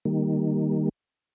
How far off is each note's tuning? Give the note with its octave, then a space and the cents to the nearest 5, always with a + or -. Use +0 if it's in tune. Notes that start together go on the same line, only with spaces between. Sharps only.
D#3 -5 G3 +0 A#3 -5